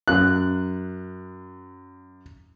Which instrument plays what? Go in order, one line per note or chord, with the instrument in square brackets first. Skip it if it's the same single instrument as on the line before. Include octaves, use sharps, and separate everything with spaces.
[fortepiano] F#2 F#6